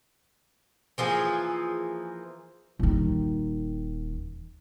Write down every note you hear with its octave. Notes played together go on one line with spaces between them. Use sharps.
E3 F3 A#3 G#4
D#1 D#3